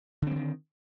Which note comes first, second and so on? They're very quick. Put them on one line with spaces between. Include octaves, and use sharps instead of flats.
D3 C4 F#3 D#3